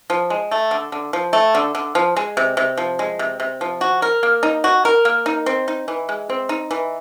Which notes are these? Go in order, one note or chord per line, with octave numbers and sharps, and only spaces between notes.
F3
G#3
A3
D3
D3
F3
A3
D3
D3
F3
G#3
C3
C3
F3
G#3
C3
C3
F3
F#4
A#4
A#3
D#4
F#4
A#4
A#3
D#4
C4
D#4
E3
G#3
C4
D#4
E3